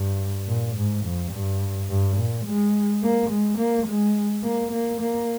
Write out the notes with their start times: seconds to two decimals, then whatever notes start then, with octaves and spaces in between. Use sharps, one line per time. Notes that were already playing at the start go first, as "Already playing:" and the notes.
Already playing: G2
0.48 A#2
0.76 G#2
1.05 F2
1.33 G2
1.90 G2
2.18 A#2
2.47 G#3
3.03 A#3
3.31 G#3
3.59 A#3
3.87 G#3
4.44 A#3
4.72 A#3
5.01 A#3